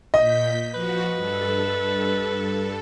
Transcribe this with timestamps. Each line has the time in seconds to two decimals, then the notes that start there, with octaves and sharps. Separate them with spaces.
0.14 A#2 D#5 G6 B6
0.74 F3 F#4 B4
1.16 G2 A4